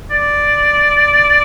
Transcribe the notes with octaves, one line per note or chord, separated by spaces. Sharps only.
D5